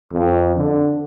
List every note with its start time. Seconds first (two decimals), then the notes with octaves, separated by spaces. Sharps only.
0.13 F2
0.57 D3